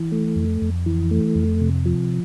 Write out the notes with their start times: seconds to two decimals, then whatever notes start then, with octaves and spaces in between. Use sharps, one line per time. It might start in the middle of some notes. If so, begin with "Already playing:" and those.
Already playing: E3
0.12 A3
0.36 F2
0.62 F2
0.86 E3
1.11 A3
1.36 F2
1.61 C3
1.86 F3